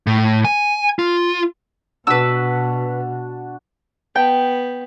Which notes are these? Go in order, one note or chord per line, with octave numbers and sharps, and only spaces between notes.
A2
G#5
F4
B2 D4 F#4 B4 E6
B3 G5